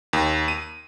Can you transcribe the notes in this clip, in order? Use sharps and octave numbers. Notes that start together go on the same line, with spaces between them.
D#2
D#7